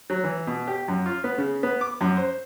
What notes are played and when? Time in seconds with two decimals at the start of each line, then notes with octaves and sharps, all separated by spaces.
0.10 F#3
0.24 E3
0.47 B2
0.67 G4
0.88 F#2
1.06 F4
1.24 B3
1.38 C#3
1.63 B3
1.81 D6
2.01 F#2
2.17 C5